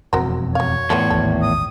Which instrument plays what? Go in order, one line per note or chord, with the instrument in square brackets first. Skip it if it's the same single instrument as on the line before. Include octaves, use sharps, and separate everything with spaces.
[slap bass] E1 F2 C4 [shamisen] F#4 A#4 C5
[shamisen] F#3 F5 [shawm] C#5
[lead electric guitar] E2 A2 [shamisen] B3 F4 A4
[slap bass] G#1 D#2 [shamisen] A4
[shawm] D#6